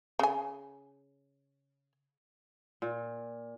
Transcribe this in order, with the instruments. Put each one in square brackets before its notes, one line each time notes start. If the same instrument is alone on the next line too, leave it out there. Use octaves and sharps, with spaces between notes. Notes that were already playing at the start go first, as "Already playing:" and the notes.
[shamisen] C#3 G#5
[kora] A#2